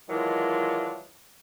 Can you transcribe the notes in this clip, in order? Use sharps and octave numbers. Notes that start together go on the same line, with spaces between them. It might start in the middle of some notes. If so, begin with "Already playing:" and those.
D#3 E3 F#3 G#3 D4 F4